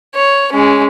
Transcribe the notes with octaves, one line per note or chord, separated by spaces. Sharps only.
C#5
G#3 C#4